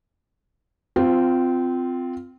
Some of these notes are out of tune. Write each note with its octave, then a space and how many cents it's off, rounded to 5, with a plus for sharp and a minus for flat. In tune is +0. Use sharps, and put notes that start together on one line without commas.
C4 -20 F4 +0